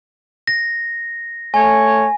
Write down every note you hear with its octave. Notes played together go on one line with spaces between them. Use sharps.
A#6
A3 C#5 G#5